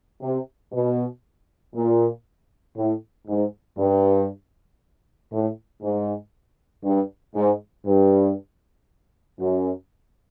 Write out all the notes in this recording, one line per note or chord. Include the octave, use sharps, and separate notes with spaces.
C3
B2
A#2
A2
G#2
G2
A2
G#2
G2
G#2
G2
F#2